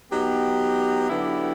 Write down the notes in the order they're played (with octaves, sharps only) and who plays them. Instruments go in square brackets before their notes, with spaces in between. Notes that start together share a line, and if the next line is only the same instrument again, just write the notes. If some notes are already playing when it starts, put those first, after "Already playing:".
[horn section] F#3 B3 D#4 G4
D3 F#3 B3 E4 G4